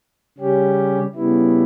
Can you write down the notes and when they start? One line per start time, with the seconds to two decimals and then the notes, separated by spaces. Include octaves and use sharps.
0.38 C#3 G3 C#4 G4
1.15 C#3 G3 B3 E4